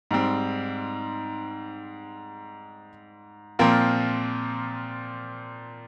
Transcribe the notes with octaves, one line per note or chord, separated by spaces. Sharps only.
G#2 G3 C4
A#2 F3 C4 F4 A#4